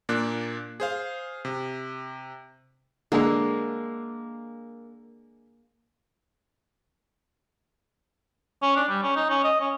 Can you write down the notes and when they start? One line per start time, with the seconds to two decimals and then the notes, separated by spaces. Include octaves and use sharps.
0.09 A#2 A#3 D4 D5 F#6
0.80 G#4 C5 F5
1.45 C3
3.12 D3 G#3 A#3
8.62 C#4
8.76 D4
8.89 G3
9.02 C#4
9.16 D#4
9.30 C#4
9.44 D#5
9.60 C#4